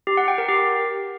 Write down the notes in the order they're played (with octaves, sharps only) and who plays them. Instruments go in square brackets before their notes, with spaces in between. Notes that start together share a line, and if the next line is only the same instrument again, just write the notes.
[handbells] G4
F#5
G5
A#4
G4